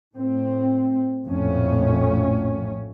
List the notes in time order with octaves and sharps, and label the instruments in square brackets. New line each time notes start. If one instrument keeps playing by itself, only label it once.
[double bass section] A2 C4
A#1 F2 A2 A3 C#4